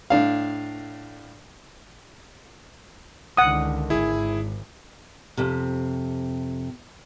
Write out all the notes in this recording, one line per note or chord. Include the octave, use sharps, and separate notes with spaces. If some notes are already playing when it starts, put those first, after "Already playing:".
A2 D4 F5
C#2 D3 D#3 F#5 D#6
G#1 E4 G#4
F2 C3